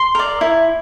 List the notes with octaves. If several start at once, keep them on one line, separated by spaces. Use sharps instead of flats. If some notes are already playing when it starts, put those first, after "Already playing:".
Already playing: C6
A#4 D5
E4